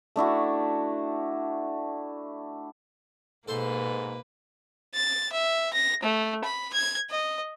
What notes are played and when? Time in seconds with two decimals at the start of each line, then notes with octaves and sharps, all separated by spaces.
0.16 A3 D4 E4 F#4
3.48 G#2 B2 A#3 A4 B4 C5 C6
4.95 A6
5.32 E5
5.73 A#6
6.03 A3
6.44 B5
6.73 G#6
7.10 D#5